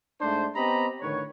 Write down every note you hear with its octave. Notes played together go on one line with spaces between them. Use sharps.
G#2 A3 D4 C5
B3 C4 G4 D#5 A#5 B5
A2 D3 D#3 B4 C#5